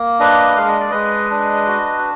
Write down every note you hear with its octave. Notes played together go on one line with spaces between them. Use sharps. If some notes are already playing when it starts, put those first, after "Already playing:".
Already playing: A#3
D4 B4 D#5
G#3 F5
D#5
D5
G#3 B4 D#5
D4
F#4